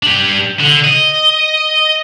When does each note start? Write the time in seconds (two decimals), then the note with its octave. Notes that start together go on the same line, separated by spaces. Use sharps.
0.03 D4 G4
0.59 D3
0.84 D#5